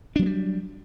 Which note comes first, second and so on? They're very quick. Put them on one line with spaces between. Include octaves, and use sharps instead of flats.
D4 F#3 B3 G3